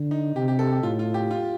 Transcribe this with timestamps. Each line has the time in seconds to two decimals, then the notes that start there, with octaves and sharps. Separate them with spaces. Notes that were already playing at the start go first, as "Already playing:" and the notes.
Already playing: D3
0.11 D#4
0.35 C3 G4
0.48 G4
0.59 A4
0.72 G4
0.83 A2 F4
0.99 F4
1.14 G4
1.31 F4